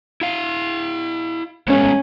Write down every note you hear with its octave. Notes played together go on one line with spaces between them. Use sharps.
E4 F5
G#3 A3 B3 C#4